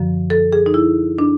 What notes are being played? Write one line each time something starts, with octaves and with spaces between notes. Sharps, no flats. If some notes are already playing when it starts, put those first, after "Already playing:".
Already playing: F#2 D3 F3
A4
G#4
D#4
E4
D4